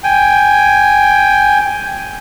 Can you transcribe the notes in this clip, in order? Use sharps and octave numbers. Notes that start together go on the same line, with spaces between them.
G5 G#5